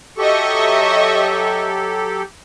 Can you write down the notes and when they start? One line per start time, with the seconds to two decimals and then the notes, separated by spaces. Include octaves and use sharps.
0.18 F#3 G4 A4 D#5 E5 C#6